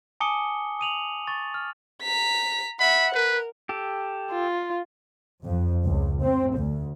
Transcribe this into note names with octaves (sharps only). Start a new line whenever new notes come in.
G#5 A5 D6 D#6 C#7 G7
D#6 D#7 F7 F#7
C#6 A6
F6
A#5 B6
E5 F#5 B5
A#4 B4
G4 A4
F4
F2
C#2
C4
D2